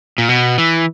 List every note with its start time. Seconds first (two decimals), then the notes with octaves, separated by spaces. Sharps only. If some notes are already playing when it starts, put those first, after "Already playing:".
0.18 A#2
0.29 B2
0.58 E3